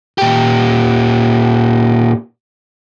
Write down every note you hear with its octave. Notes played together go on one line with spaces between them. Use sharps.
A#2 G4